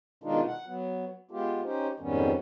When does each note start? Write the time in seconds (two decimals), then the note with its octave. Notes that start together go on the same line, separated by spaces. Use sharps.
0.24 B2 D#3 G#3 D4 D#4 F4
0.47 F#5
0.66 F#3 B3
1.31 G#3 B3 F4 G4
1.64 C#4 D#4 G4 C5
2.00 F2 G#2 D#3 G3 B3 C#4